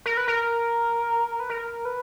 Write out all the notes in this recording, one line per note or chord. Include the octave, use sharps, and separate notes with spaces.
A#4
B4
A#4
B4
A#4
B4